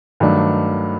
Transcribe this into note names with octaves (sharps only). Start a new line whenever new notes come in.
G2 D#3 F#3 A3 D4